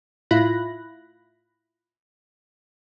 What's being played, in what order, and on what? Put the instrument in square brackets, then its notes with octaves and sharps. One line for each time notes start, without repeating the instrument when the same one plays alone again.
[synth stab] A2 E4 F4 B5 F#6 A#6